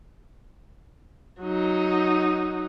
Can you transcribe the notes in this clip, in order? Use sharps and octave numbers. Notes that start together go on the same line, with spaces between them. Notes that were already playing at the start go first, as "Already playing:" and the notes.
F#3 D#4